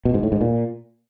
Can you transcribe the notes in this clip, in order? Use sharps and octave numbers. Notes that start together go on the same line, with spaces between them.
B2
G#2
A2
G#2
A#2